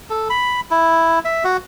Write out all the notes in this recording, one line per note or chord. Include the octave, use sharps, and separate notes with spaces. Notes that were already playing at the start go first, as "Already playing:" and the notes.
A4
B5
E4
E5
F#4